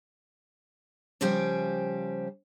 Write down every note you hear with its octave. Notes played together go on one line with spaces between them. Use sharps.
C#3 F3 G3 G4 C5 G#5